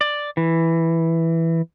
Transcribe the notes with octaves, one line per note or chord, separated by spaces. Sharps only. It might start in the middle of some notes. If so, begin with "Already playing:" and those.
D5
E3